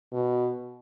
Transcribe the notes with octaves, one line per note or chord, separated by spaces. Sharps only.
B2